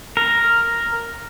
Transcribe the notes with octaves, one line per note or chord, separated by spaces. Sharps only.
A#4